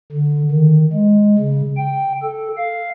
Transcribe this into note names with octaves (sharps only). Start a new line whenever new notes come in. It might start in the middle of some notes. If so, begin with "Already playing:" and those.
D3
D#3
G#3
C#3
G5
A4
F5